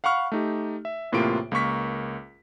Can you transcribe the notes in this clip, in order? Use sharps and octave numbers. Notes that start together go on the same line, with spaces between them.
F5 F#5 B5 C#6 F6
A3 D#4 G4
E5
E2 A2 C3 A#3 F4 D7
C#2 A#3 A#4 C#6 B6